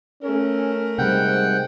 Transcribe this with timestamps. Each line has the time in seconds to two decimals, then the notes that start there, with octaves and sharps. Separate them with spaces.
0.23 A3 C#4 A#4
0.98 G#2 C3 G3 F#5 G5